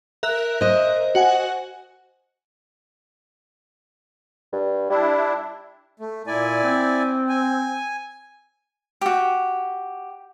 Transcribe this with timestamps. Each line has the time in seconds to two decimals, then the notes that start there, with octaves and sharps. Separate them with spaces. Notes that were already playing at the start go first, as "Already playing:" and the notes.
0.23 A#4 E5 F#6
0.61 C5 D#5
1.15 F#4 F#5 G#5
4.53 G2
4.90 G3 D4 E4
5.99 A3
6.27 A#2 E4 D5 G#5
6.63 C4
7.29 G#5
9.01 F#4 G4